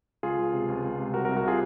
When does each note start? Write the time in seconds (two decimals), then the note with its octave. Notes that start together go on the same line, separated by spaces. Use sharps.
0.23 C#2 F4 G#4
0.39 C#2
0.53 C3
0.68 C#2
0.84 C#2
0.98 C3
1.14 C2 F#4 A#4
1.25 F#4 A#4
1.29 C2
1.36 F#4 A#4
1.44 C3 F4 G#4